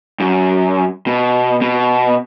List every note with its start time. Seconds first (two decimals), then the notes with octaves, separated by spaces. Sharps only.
0.20 F#2
1.07 B2
1.61 B2